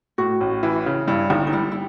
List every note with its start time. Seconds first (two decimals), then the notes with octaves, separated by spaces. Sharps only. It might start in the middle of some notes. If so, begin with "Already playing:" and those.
0.18 A2 F#4
0.41 A1
0.63 E3
0.86 C#3
1.08 G2 E4
1.30 G1 D#4
1.47 D#4
1.53 G3 E4
1.72 E4